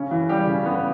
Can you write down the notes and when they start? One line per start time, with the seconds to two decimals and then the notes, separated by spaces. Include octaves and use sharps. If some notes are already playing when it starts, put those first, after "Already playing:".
Already playing: C#3 C#4
0.11 E3
0.29 G3 G4
0.47 C#3
0.66 B3